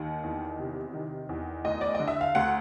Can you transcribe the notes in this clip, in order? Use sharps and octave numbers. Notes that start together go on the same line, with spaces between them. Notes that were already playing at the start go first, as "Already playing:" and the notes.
Already playing: D#2 D#3
E2
C3
D#3
E2
D2 D#5
D5
D3 D#5
E5
F5
D2 F#5